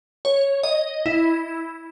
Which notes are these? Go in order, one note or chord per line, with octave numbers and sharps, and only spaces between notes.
C#5
D#5
E4